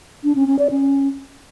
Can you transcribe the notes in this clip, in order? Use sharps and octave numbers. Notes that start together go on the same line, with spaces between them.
D4
C#4
C#4
D5
C#4